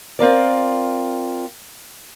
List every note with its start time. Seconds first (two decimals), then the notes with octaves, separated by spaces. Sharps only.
0.19 C4 F4 A#4 D5